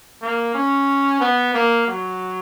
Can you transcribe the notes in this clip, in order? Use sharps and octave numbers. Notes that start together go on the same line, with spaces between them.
A#3
C#4
B3
A#3
F#3